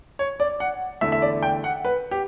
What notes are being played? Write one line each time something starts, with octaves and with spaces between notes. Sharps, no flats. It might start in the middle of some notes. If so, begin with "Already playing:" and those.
C#5
D5
F#5
E2 D3 A3 E4 E5
E5
D5
G5
F#5
B4
G4